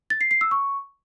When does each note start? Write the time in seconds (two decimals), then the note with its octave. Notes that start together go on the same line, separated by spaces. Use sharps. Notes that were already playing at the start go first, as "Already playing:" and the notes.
0.10 A6
0.21 C7
0.31 C7
0.41 E6
0.51 C#6